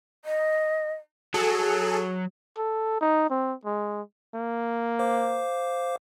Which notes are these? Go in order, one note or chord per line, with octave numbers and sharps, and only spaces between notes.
D#5
F#3 G#4 A4
A4
D#4
C4
G#3
A#3
C5 F5 D6